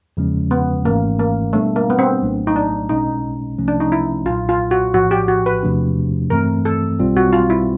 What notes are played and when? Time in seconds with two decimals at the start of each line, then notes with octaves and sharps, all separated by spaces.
0.17 E2 C#3 F3 G#3 C#4
0.51 B3
0.85 G#1 G#2 E3 A3 A#3 C#4
1.19 A#3
1.53 B2 G3 A3 B3 D4
1.76 A#3
1.90 B3
1.99 C4
2.22 A#1 A2 F#3 A3 D4
2.47 D#4
2.56 D4
2.89 B1 B2 G#3 C#4 D#4
3.58 C2 C3 F3 A3 C#4
3.68 D4
3.80 D#4
3.92 E4
4.26 B1 A#2 F#3 F4
4.49 F4
4.71 F#4
4.94 A#1 A2 F3 F#4
5.11 G4
5.28 F#4
5.46 B4
5.63 E2 C3 F3 A3 D4
6.30 G2 E3 A3 C4 A#4
6.65 A4
6.99 B1 B2 G3 C4 F4
7.17 F#4
7.33 F4
7.50 E4